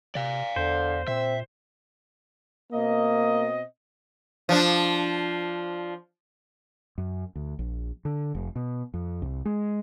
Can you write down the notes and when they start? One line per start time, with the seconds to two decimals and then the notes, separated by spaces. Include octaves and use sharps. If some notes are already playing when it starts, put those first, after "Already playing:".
0.15 C3 D5 F5
0.56 E2 D3 C5
1.08 A#2 C4 E5
2.72 B2 A#3 C4 D#5
4.49 F3 D4
6.98 F#2
7.35 D2
7.59 A#1
8.05 D3
8.35 F1
8.56 B2
8.94 F2
9.22 C2
9.45 G#3